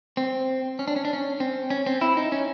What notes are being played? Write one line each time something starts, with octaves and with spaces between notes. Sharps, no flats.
C4
C#4
D4
C#4
D4
C#4
C4
C#4
C4
E4
D#4
C#4